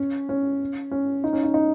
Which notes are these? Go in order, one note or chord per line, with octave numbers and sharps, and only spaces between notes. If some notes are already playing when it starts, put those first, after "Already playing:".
Already playing: C#4
C#4
C#4
D#4
C#4
D#4
D#4